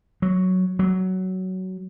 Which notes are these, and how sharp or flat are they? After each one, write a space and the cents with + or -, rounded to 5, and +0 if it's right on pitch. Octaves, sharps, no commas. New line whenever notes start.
F#3 +0
F#3 +15